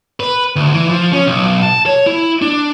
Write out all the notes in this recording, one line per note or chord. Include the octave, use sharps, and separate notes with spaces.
B4
D2
E3
F3
C#4
B1
A5
C#5
E4
D4